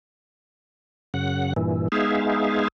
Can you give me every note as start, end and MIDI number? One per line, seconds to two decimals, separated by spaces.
1.14 1.53 42
1.14 1.53 49
1.14 1.53 78
1.56 1.88 43
1.56 1.88 46
1.56 1.88 52
1.92 2.68 56
1.92 2.68 59
1.92 2.68 63
1.92 2.68 68
1.92 2.68 76
1.92 2.68 77